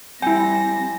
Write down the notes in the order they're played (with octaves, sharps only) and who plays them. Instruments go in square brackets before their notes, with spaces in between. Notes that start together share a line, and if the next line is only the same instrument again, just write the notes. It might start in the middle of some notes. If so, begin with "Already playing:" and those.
[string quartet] G3 A#6 [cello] C4 [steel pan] E4 G5 [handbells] G#5